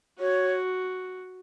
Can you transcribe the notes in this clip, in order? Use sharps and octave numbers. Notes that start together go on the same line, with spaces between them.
F#4 C#5